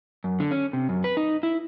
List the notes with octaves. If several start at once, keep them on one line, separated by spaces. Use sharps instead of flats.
F#2
D3
C#4
C3
F#2
B4
D#4
E4